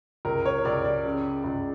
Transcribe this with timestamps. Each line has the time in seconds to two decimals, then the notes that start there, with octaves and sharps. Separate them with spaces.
0.25 C#2 A#4
0.45 C#5
0.65 C#2 D5
0.84 D5
1.05 C#3
1.44 C#2